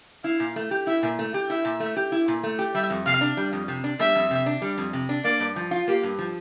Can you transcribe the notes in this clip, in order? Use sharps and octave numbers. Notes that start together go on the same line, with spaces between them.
E4 F5
A#2
A3
G4
E4 E5
A#2
A3
G4
E4 E5
A#2
A3
G4
E4
A#2
A3
G4
G3 E5
F2
C3 F5
D4
G3
F2
C3
D4
G3 E5
F2
C3
D4
G3
F2
C3
D4
A#3 D5
G2
F3
F4
A#3 G4
G2
F3